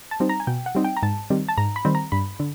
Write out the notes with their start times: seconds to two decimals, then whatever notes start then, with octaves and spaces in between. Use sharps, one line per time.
0.11 A5
0.20 G3 C4 D#4
0.29 A#5
0.40 G#5
0.47 B2 G5
0.66 F#5
0.75 G3 C4 D#4
0.84 G5
0.97 A#5
1.03 G#2 A5
1.30 D#3 G3 C4
1.48 A5
1.58 G#2 A#5
1.76 B5
1.85 D#3 G3 C4
1.95 A#5
2.12 G2 B5
2.40 D3